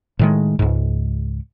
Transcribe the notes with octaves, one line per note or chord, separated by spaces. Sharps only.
A2 D#3 G#3
C#2 G#2